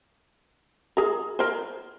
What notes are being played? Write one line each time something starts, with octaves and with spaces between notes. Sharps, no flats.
G#4 A#4
A#4 C5